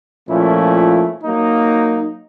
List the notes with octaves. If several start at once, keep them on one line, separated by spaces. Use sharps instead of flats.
A#2 F3 A3 C#4 E4
F#3 A#3 D#4